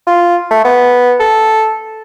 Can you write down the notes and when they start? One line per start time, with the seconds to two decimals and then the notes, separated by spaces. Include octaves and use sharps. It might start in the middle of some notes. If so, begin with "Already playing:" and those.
0.07 F4
0.51 A3
0.65 B3
1.20 A4